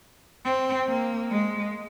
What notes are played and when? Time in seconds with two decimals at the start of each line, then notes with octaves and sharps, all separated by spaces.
0.45 C4
0.88 A#3
1.31 G#3